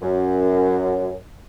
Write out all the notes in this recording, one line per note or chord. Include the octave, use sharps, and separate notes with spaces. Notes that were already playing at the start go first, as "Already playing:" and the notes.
F#2